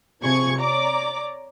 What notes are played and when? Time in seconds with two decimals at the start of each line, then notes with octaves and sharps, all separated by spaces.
0.23 C3 F3 G#4 C#6 G#6 C#7
0.58 C#5 D5 A#5 D6